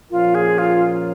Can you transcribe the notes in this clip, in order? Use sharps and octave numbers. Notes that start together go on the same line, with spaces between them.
A#2 F3 C#4 F4 A#4
G#4
F4